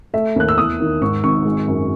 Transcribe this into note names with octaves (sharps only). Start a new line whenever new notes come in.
A3 E5
D#2 F#6
E6
E2 D#6
D#3
G#2 C#6
G#1 C#6
G#3
F#2